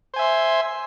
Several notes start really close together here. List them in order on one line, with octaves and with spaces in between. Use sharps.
C5 G#5 E5 C6